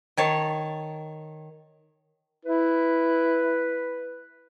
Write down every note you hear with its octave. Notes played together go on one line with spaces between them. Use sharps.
D#3 C#5 A5
E4 B4